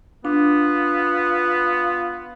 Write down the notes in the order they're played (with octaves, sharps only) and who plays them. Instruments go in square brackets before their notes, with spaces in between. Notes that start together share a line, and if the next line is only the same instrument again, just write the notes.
[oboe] B3 [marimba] D4 [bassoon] F4